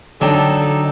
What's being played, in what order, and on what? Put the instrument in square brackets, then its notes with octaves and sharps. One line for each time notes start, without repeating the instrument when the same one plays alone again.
[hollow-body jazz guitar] D3 [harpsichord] F#3 D4 G5 [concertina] D#4 [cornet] A4